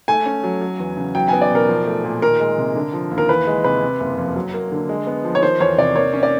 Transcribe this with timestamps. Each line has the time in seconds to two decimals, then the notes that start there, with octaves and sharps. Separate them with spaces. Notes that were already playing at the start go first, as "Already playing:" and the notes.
0.08 A3 G#5
0.26 C#4
0.44 F#3
0.62 F#3
0.79 E2
0.97 C#3
1.15 F#3 G5
1.28 B3 G#5
1.42 D5
1.51 B2 A#4
1.69 F3
1.86 A3
2.04 A#2
2.22 D#3 A#4
2.40 G#3
2.58 C3
2.75 D3
2.93 F3
3.11 D#2
3.18 A#4
3.29 E3 B4
3.47 G#3
3.64 C3 B4
3.82 C3
4.00 F#1
4.18 F2
4.36 F#3
4.54 A#3
4.72 D3
4.89 G#3
5.07 B3
5.25 F3
5.35 C#5
5.42 D#3 C5
5.60 E2 C#5
5.78 C3 D5
5.96 A#3 C#5
6.14 C#4
6.23 D5